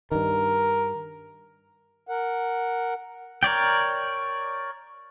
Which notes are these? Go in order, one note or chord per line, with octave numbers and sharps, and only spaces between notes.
G2 D#3 A#4
A#4 F#5
A#4 C#5 D5 G5